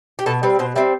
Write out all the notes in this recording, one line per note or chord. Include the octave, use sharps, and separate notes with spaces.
G4
B2 A4
G3 C4 B4
B2 C5
G3 C4 E5